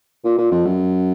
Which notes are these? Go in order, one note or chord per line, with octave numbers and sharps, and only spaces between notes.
A#2
A#2
F2
F#2